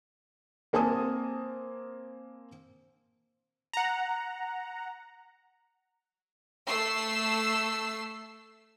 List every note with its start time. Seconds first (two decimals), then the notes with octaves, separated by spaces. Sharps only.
0.73 A#3 C4 G#5 A5 D#6
3.73 F#5 A#5
6.67 A3 E6 C7